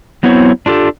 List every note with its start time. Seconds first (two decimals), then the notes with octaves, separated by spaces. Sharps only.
0.23 F#3 B3 C4 E4 C#5
0.66 D4 F4 G4 A4